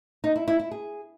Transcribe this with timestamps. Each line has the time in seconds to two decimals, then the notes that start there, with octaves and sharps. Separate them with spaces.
0.24 D#4
0.36 E4
0.48 E4
0.60 E4
0.71 G#4